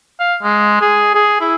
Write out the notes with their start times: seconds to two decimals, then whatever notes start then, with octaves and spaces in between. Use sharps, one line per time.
0.20 F5
0.43 G#3
0.81 G#4
1.14 G#4
1.41 E4